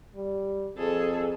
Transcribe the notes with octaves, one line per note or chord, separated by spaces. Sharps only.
G3
F2 G#4 A4